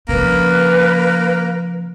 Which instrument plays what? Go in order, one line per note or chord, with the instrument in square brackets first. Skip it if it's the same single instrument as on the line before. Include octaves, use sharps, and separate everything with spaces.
[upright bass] C#3 F3 [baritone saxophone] A#3 [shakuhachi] B4